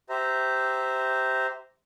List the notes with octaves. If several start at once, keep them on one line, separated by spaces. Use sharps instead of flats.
G4 C5 E5 A#5